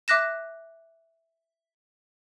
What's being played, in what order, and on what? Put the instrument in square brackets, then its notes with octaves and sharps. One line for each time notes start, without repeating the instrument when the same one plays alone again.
[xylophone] E5 D6 F#6 A#6 E7